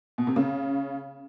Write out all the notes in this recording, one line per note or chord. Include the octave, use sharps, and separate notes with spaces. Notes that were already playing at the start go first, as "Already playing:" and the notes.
B2
C3
C#3